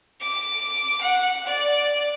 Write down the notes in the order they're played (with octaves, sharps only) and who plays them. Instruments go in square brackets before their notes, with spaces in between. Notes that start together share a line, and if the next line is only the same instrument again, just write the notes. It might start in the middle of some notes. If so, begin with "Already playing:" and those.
[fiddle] D6
F#5
D5